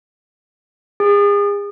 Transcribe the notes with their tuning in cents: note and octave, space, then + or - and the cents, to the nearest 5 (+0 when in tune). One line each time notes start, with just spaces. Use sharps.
G#4 -35